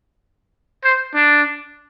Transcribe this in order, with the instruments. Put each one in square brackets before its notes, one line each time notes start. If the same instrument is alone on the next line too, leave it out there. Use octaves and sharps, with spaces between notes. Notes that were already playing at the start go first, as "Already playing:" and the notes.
[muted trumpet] C5
D4